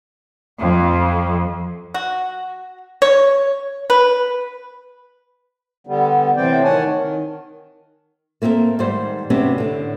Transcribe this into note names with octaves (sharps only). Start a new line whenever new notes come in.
F2
F#4
C#5
B4
D3 G3 B3
A2 C3 E3 C4 D5 G5
D#3 C#5 F#5 G#5 A5
D#3
A3 A#3 C4 G#4 A#4
G#2 D#3 G3 C5
C3 B3 C#4 D4 F#4 G4
A2 D3